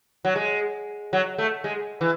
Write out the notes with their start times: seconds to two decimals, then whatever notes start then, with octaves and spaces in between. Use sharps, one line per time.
0.25 F#3
0.36 G#3
1.13 F#3
1.38 A3
1.64 G#3
2.01 E3